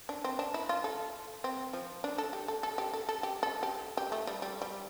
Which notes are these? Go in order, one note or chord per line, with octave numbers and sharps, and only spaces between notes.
D4
C4
D4
E4
F4
A4
C4
F3
D4
A4
G4
A4
A4
G4
A4
A4
G4
A4
G4
G4
A3
G3
G3
G3